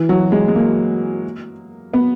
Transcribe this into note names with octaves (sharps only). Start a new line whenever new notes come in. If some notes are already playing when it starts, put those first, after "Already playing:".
Already playing: E3
F#3
G#3
G#3
A#3
B3